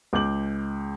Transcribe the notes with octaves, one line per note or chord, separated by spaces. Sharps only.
C#2 D6 G6 F#7